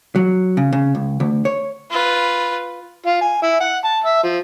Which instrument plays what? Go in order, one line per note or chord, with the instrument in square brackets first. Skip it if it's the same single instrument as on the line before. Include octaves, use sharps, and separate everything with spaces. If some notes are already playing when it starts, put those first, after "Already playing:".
[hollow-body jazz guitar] F#3
C#3
C#3
C#2
D2
C#5
[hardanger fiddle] F4 B4
[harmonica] F4
G#5
E4
F#5
A5
E5
F3